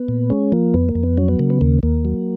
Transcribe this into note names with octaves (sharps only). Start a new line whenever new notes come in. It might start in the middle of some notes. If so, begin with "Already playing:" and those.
Already playing: B3
A#2
G#3 C#4
F3 A#3
F2 B3
A#3
F2
B3
F#3 C#4
B3
C#3 A#3
B3
D#2 A#3
D#2 A#3
F#3